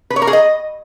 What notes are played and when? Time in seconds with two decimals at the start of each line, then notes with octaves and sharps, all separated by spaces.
0.10 B4
0.16 C#5
0.22 A#4
0.27 G#4
0.33 D#5